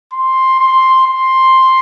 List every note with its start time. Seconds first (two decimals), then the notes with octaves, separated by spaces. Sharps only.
0.13 C6
0.59 C6
1.06 C6